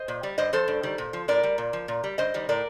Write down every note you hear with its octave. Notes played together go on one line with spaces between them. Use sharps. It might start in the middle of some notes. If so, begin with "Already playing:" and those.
Already playing: C5 D#5
A#2
G3
G2 C5 D#5
F3 A4 C5
G2
D#3 G3
A#2
F3
A2 A#4 D5
G3
A#2
F3
A#2
G3
G2 C5 D#5
D#3 G3
A2 A#4 D5